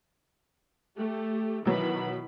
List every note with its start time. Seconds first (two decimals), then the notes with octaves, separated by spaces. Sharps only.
0.98 A3 G4
1.65 B2 D#3 E3 F#3 B5